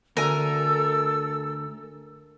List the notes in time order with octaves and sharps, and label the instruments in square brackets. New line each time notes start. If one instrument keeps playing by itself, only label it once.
[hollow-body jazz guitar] D2 [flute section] A4 E6 [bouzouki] A#4 G#5